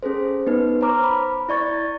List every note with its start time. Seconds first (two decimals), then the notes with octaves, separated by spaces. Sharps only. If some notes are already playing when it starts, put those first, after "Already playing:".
0.03 C#4 G#4 A4 C5
0.47 B3 D#4 B4
0.81 C5 C#5 A#5 D6 F6
1.04 B5
1.49 E4 D5 C#6 A6